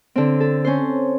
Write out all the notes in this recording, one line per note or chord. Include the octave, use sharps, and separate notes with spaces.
D3 C4
A4
C#4 C5